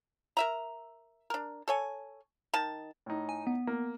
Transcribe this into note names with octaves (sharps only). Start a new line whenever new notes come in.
A#4 E5 A#5
D4 A#4
A4 C#5 G#5
D#3 A5
A2 D#4
G#5
B3
A#3